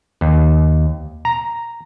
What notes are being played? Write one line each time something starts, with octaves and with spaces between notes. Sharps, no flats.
D#2
A#5